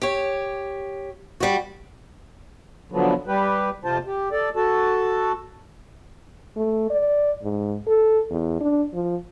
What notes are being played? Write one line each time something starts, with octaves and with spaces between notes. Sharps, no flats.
G4 C#5
G3 F#4
D3 F3 F#3 B3
G3 G4 B4
F2 C3 F3 F4 C5 A5
G4
A4 D5
F#4 A4 A5
A3
D5
G#2
A4
E2
D4
F3